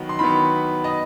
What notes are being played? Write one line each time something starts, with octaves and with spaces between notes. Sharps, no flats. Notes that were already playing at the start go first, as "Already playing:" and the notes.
Already playing: D#3 F#3 B3
C6
D#3 F#3 B3 B5
D#5